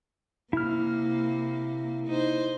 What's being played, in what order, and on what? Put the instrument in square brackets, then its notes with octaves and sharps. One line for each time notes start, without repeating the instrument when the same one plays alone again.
[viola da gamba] C3 A#3 [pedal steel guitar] E4 F6
[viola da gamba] D#4 C5